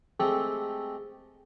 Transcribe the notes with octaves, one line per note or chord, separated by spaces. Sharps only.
G#3 A3 C4 G4 A4